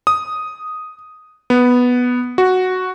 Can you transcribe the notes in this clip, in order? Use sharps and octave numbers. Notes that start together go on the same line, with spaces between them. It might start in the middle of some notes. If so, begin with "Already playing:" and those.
D#6
B3
F#4